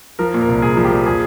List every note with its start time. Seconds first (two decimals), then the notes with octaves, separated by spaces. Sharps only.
0.19 F3 A#4
0.34 A#2
0.41 A#4
0.48 C2
0.62 C2 G#4
0.77 F3
0.85 G4
0.91 A#2
1.06 F3 G#4